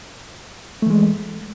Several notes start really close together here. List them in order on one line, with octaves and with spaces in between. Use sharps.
A3 E3 G#3